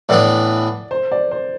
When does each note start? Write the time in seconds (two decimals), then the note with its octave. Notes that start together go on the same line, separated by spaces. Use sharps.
0.09 A2 E3 B3 D4 D5
0.91 C5
1.12 D5
1.31 C5